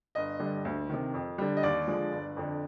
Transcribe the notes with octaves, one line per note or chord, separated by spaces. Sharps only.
G1 D#5
G2 D3 G3
D2
C3 D#3
F2
D3 G3
D#5
D#2 D5
D3 F3 G#3
G1
F2 D3